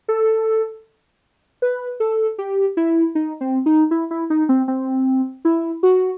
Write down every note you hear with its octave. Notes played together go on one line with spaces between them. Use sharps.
A4
B4
A4
G4
E4
D#4
C4
D#4
E4
E4
D#4
C4
C4
E4
F#4